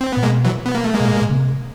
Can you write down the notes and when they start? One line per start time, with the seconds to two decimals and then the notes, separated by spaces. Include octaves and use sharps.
0.01 C4
0.12 A#2 B3
0.23 B2 G#3 A#3
0.44 E3 F#3
0.66 B3
0.75 A#3
0.84 A3
0.94 G#3 A#3
1.00 B2
1.08 A#2
1.22 A#2
1.29 C#3
1.36 C3